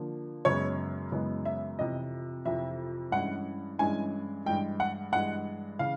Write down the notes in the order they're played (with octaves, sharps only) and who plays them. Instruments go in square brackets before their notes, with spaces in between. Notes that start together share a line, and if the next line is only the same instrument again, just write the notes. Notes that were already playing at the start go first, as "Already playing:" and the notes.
Already playing: [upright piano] D3 F3 A#3
F#2 C#3 E3 G#3 B3 C#5
F#2 C#3 E3 G#3 B3
E5
F2 C3 E3 D#5
F2 C3 E3 E5
G2 E3 G#3 C#4 E4 F#5
G2 E3 G#3 C#4 E4 G#5
G2 E3 G#3 G5
F#5
G2 E3 G#3 F#5
C#3 E3 F5